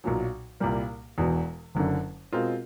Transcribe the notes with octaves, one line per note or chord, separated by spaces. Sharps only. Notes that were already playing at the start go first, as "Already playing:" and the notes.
B1 A#2 F#3
C2 A#2 G3 A#3
E1 E2 B2
F#1 F#2 D3
B2 G#3 C4 F4 A#4